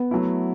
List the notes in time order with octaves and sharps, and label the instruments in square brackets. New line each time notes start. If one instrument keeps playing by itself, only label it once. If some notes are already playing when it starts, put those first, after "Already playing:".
Already playing: [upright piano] B3
[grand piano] F#3 A3 E4